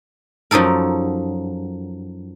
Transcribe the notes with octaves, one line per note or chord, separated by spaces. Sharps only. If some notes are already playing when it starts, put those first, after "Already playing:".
F#2 F3 D#4 A4 A#4